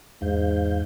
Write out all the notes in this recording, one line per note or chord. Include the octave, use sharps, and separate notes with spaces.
E2 G#2 F5 G6